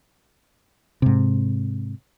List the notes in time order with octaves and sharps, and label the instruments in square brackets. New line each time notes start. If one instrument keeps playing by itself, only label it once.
[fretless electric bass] G#2 C3